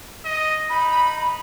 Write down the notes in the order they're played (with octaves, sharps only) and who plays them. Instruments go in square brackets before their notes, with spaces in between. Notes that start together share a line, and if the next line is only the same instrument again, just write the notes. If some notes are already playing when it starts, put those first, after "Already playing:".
[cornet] D#5
[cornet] D#4 [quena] B5